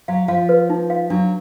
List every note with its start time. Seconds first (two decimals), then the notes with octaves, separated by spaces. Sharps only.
0.08 F#3 F5
0.28 F3 F5
0.49 B4
0.70 D#4
0.90 F5
1.10 F#3 D4